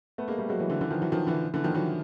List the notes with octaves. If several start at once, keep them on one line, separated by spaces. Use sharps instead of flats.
A3 B3
G#3 A#3
G3 A3
F#3 G#3
E3 F#3
D3 E3
D3 E3
D#3 F3
E3 F#3
D#3 F3
D3 E3
D3 E3
D#3 F3
E3 F#3